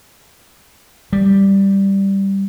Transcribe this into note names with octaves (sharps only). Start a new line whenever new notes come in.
G3